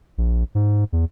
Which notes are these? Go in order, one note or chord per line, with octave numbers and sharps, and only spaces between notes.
A#1
G#2
E2